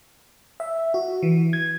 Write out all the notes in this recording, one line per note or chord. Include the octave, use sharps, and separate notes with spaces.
E5
F#4
E3
G#6